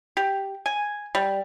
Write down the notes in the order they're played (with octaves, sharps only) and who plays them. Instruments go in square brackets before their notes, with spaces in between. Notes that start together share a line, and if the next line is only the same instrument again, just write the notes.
[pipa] G4
G#5
G3